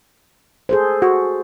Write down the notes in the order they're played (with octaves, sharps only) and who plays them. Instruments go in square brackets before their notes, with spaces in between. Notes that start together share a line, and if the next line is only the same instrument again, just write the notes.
[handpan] G#4 A4 C5
[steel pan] F#4